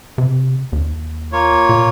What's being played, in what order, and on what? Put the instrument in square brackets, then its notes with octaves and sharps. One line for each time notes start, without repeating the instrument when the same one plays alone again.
[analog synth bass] C3
D#2
[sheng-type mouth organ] A#3 F4 C#5
[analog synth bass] A#2